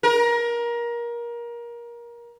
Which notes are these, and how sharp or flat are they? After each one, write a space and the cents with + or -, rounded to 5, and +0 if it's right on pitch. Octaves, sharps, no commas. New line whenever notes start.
A#4 +25